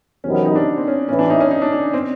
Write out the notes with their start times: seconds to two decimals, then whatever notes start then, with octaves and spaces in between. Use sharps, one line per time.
0.24 E2 C3 D#3 F#3 B3 C#4
0.34 C#4
0.45 D#4
0.55 D4
0.77 C4
0.88 C#4
1.09 A1 A2 E3 C#4
1.19 D4
1.30 D#4
1.40 C#4
1.51 D#4
1.62 D4
1.72 D4
1.94 C4